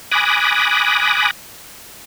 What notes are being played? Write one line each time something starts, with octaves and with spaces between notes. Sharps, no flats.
G#5 B5 D6 D#6 F#6 A#6